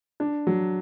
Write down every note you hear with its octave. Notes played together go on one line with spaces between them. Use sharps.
D4
F#3